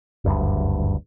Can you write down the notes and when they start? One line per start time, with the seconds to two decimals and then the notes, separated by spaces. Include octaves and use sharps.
0.25 F#1 D2 G2